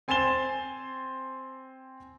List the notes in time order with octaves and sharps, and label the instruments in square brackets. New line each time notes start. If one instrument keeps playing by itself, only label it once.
[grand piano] C4 G#5 C6 A6 E7 G7